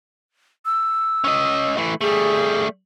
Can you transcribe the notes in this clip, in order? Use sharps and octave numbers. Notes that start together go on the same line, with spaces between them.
E6
C#4 D#5
E3 A3
G3 A3 G#4